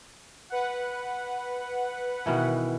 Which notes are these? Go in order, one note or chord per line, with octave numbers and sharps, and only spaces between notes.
B4 F#5
B2 D#3 E3